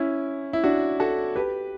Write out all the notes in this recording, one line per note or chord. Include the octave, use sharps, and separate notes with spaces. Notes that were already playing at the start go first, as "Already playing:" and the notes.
Already playing: C#4 E4
E4
D4 F#4
F#4 A4
G4 B4